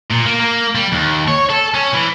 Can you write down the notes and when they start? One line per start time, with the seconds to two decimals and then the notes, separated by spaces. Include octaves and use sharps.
0.10 A#2
0.26 A#3
0.40 A#3
0.75 G3
0.92 D#2
1.28 C#5
1.50 A4
1.74 C#4
1.94 E3